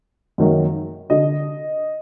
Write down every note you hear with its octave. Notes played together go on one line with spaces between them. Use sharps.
F#2 D#3 F#3 A#3
D3 D#5